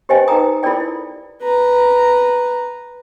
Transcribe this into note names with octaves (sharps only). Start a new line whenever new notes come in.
G4 B4 C5 D#5 G5 G#5
D#4 A#4 B4 G5 A#5 D#6
E4 F4 A4 A#4 D5 G5
E4
B4 A#5